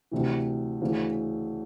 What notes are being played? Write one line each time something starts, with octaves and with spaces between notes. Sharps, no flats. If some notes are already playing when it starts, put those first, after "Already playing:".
D2 C3 E3
D2 C#3 E3